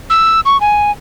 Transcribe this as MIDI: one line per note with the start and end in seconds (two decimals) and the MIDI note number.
0.10 0.40 88
0.45 0.60 85
0.61 0.91 80